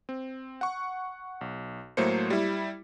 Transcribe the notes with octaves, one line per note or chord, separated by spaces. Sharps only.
C4
F#5 C#6
B1
A2 F#3 A3 A#3 C5 C#7
G3 E4